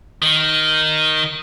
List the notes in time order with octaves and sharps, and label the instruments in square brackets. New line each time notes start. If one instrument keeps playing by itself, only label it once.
[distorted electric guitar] D#3